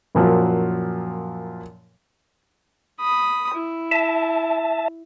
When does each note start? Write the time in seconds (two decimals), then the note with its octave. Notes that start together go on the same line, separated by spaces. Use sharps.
0.15 F#2 A#2 F3 F#3
3.00 B5 D#6
3.54 E4
3.91 E5 A5